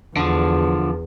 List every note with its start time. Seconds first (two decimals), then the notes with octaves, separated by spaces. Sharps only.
0.17 E2 D3 F3